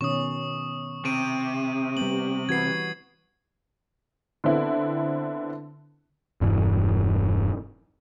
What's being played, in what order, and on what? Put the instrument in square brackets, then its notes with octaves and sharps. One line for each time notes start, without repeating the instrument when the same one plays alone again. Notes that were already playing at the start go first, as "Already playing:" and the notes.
[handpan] B2 D#3 C#4 [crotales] C#6 D#6
[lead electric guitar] C3 [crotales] C#6 D7 D#7
[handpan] G3 B3 [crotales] F#7
[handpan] E3 F#4 B4 [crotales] G#6 C7
[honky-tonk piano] D3 B3 C4 E4 A4
[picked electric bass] E1 G2 E3